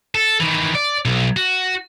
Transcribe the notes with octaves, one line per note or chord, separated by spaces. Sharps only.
A4
D#3 E3
D5
B1
F#4